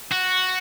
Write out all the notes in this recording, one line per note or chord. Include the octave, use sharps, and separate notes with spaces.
F#4